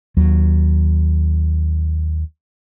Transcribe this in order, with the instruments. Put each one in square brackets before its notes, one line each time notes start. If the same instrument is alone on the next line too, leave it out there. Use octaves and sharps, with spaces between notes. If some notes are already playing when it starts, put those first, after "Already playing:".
[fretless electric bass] D#2 F#3